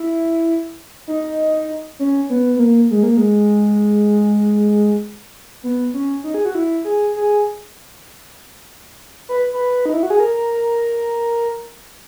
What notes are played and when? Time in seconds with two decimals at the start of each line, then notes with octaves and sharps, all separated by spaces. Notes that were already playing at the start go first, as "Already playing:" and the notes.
Already playing: E4
1.08 D#4
1.99 C#4
2.30 B3
2.56 B3
2.59 A#3
2.91 G#3
3.03 A#3
3.17 G#3
5.63 B3
5.94 C#4
6.24 D#4
6.34 G#4
6.45 F#4
6.55 E4
6.85 G#4
7.16 G#4
9.29 B4
9.53 B4
9.86 D#4
9.93 E4
10.03 F#4
10.10 G#4
10.20 A#4